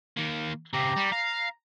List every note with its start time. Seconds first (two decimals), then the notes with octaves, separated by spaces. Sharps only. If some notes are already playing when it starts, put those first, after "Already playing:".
0.17 D#3 A#3
0.73 C#3 C4 G4 A#5
0.96 G3
1.12 F5 A#5